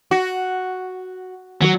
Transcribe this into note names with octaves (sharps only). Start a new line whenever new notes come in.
F#4
D#3 F#3 F#4